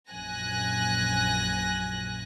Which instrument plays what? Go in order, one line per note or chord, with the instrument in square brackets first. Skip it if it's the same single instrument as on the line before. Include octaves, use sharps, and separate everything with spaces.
[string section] A#1 F#2 G#5 F#6 A#6